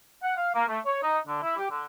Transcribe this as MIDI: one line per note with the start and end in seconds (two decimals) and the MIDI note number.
0.22 0.33 78
0.36 0.50 77
0.54 0.65 58
0.69 0.79 57
0.85 1.00 73
1.02 1.18 63
1.27 1.42 50
1.42 1.56 64
1.58 1.66 67
1.70 1.85 50